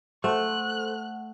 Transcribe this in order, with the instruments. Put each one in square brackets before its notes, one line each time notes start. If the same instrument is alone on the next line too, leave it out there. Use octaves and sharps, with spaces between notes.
[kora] A3 [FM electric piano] A4 C5 [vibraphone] F#5 [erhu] F#6